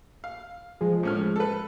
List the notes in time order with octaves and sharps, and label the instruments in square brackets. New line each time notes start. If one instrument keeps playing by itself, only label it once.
[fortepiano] F5
[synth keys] F3 G#3
[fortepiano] A2 C#4 F6
A4 B4